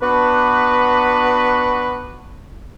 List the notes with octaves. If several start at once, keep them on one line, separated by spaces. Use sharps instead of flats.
B3 D4 F#4 B4